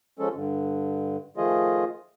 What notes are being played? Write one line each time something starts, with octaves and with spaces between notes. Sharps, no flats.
F3 G#3 C#4 A4
G2 D3
D#3 F3 A3 F4 G#4 D#5